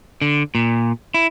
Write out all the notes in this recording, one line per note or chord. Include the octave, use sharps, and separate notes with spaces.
D3
A#2
E4